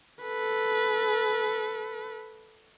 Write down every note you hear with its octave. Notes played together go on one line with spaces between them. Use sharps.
A4 B4